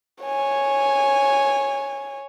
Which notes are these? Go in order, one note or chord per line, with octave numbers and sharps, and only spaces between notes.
C#5 G#5